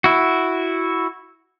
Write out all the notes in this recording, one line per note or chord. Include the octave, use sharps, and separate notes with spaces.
E4 F#4